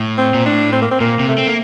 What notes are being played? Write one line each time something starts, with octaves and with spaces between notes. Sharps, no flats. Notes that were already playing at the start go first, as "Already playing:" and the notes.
Already playing: A2
C4
A#2
A2 D4
C4
A#3
C4
A#2 A#3
C3
A3
C4
A#3